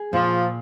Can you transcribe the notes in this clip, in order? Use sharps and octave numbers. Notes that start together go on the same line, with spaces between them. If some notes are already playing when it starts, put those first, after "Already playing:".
Already playing: G#4
A#2 F3